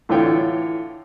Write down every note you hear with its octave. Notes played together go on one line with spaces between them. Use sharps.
A2 D3 E3 F4 C#5 G5